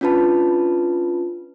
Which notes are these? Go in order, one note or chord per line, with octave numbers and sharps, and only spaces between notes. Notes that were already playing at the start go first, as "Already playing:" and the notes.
C#4 D4 F4 B4 A5 B5